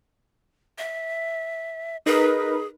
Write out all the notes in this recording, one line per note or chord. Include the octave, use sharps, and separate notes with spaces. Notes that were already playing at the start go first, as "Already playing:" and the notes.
E5
D#4 G#4 A#4 B4